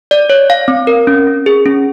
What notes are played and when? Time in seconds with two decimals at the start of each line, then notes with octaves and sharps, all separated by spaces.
0.11 D5
0.30 C#5
0.50 F5
0.68 C4
0.87 A#4
1.07 C#4
1.27 C#4
1.46 G#4
1.66 C#4